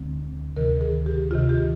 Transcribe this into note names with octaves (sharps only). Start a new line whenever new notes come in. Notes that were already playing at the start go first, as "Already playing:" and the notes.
Already playing: D2 D3 G#3 C4
D2 C3 D#3 A#4
G#4
G4
D2 C3 D#3 F4
G4